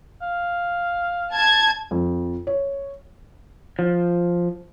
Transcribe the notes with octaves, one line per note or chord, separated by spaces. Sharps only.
F5
A5 G#6
F2
C#5
F3